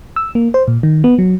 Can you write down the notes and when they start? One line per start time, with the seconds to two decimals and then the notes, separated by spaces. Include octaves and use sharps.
0.16 E6
0.35 A#3
0.54 C5
0.68 A#2
0.83 D#3
1.04 B3
1.19 F#3